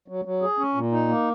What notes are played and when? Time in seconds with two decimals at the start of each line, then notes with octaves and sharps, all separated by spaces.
0.08 F#3
0.25 F#3
0.42 G#4
0.59 C#4
0.75 A#2
0.92 D#4
1.08 A#3